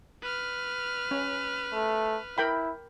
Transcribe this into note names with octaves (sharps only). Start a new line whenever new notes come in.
B4 F6
C#4
A3
E4 A#4 G5 B5